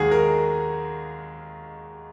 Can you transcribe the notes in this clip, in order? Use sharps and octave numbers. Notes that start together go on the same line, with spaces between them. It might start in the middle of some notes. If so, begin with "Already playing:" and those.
Already playing: D#2 D#3 G#3 F#4 G#4
A#4